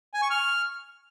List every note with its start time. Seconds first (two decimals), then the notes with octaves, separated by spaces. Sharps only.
0.14 G#5
0.22 C#6
0.30 F6